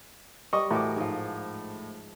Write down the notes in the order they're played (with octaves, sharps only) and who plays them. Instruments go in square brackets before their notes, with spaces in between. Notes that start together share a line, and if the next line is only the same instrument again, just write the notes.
[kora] G3 [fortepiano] D#5 C#6 D#6
[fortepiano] A2 D6 [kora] E3 F#4 A#4
[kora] G#2 F3